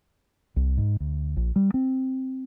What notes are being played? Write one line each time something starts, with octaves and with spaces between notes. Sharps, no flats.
C2
G#2
D2
A#1
G3
C4